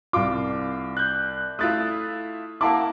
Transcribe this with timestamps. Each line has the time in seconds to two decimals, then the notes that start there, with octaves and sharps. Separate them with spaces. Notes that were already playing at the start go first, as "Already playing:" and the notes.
0.13 C2 F4 D6
0.97 F#6 G6
1.59 A3 E4 F4 D#6 F#6 A6
2.61 A#3 E4 F#5 A5 D6